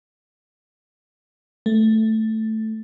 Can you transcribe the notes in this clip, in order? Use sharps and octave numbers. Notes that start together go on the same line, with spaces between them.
A3